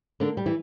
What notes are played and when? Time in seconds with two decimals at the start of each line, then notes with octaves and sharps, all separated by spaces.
0.20 D3 A#3 D4
0.37 G3
0.46 E3 E4